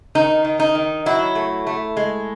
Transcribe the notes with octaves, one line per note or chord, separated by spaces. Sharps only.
D#3 D#4
D#3
D#4
D#3
F#3 E4
A3
A3
G#3